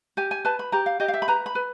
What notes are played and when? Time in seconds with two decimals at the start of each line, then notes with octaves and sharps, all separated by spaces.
0.17 G4 G#5
0.31 G#5
0.45 B4 A5
0.59 B5
0.72 G4 A#5
0.86 F5
1.00 G4 D#5
1.08 F5
1.14 E5
1.22 B5
1.28 B4 A#5
1.46 B5
1.55 B4